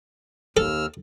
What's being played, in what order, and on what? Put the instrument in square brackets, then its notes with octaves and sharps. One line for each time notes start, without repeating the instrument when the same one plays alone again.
[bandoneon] D#2 E6 F6 [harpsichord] A4